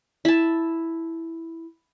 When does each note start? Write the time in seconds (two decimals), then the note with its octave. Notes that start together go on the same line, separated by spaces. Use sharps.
0.25 E4 A5